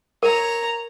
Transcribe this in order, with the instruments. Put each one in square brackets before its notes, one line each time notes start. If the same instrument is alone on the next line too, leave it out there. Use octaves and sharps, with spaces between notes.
[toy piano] A#4 [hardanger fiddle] C#5 A#5